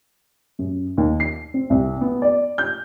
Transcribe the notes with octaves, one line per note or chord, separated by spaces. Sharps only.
F#2
D#2
C7
C4
C2
B3
D5
G6